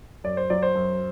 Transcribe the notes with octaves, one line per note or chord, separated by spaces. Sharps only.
F#2 D5
C5
F#3 D5
C5
F#2